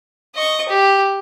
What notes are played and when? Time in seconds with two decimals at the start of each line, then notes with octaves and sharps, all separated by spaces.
0.35 D#5 C#6
0.69 G4